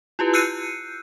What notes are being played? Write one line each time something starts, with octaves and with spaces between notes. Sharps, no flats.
E4 F4 G4 B4
E6 F#6 G6 C7 C#7 D#7